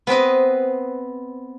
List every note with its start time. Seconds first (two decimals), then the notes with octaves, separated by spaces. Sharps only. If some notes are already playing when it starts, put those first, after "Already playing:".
0.07 B3 C4 B4 D#5